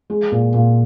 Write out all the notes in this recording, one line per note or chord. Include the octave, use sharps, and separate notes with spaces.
G#3
A#2
A#2